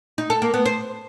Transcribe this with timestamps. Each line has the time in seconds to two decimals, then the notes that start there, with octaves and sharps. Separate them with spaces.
0.18 D#4
0.30 A4
0.42 A#3
0.54 B3
0.66 C5